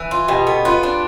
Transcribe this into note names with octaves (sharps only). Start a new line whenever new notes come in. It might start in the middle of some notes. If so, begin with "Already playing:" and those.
Already playing: E3
F4
B2 G4
B3 A4
F4 B4
D4